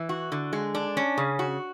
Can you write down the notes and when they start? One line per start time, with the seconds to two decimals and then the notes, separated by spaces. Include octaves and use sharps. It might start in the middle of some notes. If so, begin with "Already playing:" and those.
Already playing: E3
0.09 F#4
0.32 D3
0.53 G#3
0.75 D4
0.97 C#4
1.18 C#3
1.39 F#4